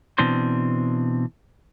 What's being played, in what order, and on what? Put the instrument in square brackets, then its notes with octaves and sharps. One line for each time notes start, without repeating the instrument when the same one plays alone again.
[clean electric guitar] B2 E3 C4 D4 C5